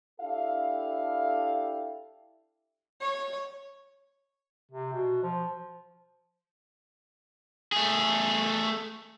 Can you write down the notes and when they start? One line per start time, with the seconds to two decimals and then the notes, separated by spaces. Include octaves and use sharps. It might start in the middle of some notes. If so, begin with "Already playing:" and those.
0.20 D4 E4 G4 A4 E5 F5
3.01 C#5
4.71 C3
4.93 B2
5.23 F3
7.72 A3 G#4